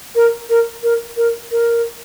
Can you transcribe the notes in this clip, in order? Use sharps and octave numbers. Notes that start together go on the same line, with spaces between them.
A#4
A#4
A#4
A#4
A#4